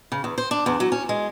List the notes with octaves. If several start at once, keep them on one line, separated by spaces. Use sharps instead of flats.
C#3
E2
C5
D4
E2
F#3
C#4
G#3